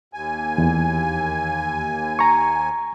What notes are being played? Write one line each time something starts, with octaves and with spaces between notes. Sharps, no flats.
D#2 G#5
E2
A#5 C#6